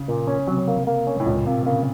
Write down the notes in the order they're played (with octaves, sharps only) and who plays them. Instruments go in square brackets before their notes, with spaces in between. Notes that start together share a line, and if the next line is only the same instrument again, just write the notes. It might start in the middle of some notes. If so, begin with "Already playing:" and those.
Already playing: [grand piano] C#3
[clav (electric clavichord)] A#2
C#4
[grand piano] C3 [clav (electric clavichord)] F#3
[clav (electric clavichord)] A#3
A#3
C#4
[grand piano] A2
[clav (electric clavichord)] C#2 [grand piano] A#2
[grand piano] C3 [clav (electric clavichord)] A#3
[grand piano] C#3 [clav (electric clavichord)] A#3